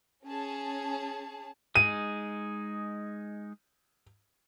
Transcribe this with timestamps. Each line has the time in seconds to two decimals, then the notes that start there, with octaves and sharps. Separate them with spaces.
0.25 C#4 G#4 A5
1.76 G#3 D#4 G#4 D#7